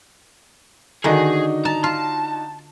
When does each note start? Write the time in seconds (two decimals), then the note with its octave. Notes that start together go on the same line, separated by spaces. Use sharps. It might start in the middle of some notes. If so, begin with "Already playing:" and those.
1.04 D3 D#3 D4 D#4 F#4 G#4
1.65 A5 A#5
1.84 F4 A5